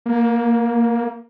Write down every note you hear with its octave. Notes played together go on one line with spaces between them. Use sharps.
A#3